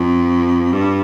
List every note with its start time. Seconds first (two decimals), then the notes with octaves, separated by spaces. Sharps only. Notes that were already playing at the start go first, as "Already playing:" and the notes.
Already playing: F2
0.73 G2